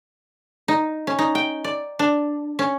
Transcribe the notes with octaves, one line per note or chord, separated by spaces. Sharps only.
D#4
C#4
D#4
G5
D5
D4
C#4